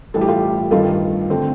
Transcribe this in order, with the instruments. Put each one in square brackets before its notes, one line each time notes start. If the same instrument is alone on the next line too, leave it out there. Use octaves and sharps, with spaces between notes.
[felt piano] A1 A2 G3 A4
G4
F4 A4
G2 D#3 A3 F4 A4
D3 A3 C4